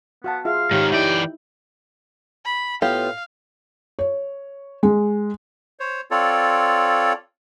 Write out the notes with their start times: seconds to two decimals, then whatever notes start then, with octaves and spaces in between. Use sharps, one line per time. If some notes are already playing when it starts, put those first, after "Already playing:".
0.24 B3 F#4 F5 A5
0.45 F4 G#4 E5 F5
0.71 G#2 D#3 G4 C#5
0.92 E3 D#4 E4 D5 E5 G5
2.45 B5
2.82 A2 B3 F4 G4 F5
3.99 C#5
4.83 G#3
5.80 C5 C#5
6.11 C4 F4 A4 C#5 D5